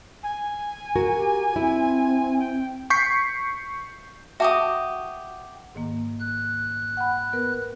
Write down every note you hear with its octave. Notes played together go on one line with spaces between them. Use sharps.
G#5
F#4 A#4
G4
C4 E4
G5
C#6 G6 B6 C7
F#4 G4 E5 A5 D6 D#6
G#2 D#3 A#3
F#6
F#5 G5 B5
B3 A#4 B4